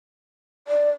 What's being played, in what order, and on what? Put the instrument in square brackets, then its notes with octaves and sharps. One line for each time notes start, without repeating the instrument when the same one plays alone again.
[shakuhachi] D5